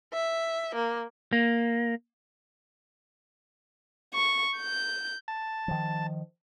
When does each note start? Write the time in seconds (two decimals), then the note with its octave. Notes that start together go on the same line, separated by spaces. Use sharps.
0.13 E5
0.75 A#3
1.33 A#3
4.14 C#6
4.58 G6
5.28 A5
5.68 D#3 F3